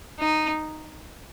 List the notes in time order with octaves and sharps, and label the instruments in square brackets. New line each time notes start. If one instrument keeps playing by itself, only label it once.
[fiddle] D#4